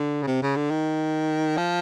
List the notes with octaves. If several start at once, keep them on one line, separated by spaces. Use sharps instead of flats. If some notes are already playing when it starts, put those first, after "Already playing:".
Already playing: D3
C#3
C3
C#3
D3
D#3
F3